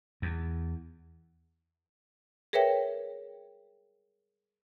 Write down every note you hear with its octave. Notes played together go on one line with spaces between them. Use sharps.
E2
G#4 A#4 B4 C#5 E5 G5